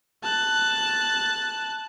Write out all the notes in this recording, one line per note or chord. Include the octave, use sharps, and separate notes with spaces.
A5 F#6